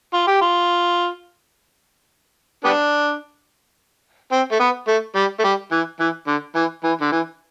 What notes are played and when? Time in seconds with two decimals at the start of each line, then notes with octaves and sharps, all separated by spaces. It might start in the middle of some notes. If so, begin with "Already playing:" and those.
0.14 F4
0.27 G4
0.41 F4
2.65 G3 B3 D4
4.32 C4
4.52 A3
4.60 B3
4.88 A3
5.15 G3
5.39 A3
5.44 G3
5.72 E3
6.00 E3
6.27 D3
6.55 E3
6.84 E3
7.01 D3
7.12 E3